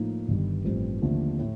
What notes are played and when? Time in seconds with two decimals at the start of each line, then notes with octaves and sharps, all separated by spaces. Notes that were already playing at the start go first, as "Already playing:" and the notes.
Already playing: A2 F3 A#3 D#4
0.28 G1 G2 D#3 G3
0.65 A1 G2 F3 C4
1.02 D#2 D3 F3 A3 C4
1.39 A2 A3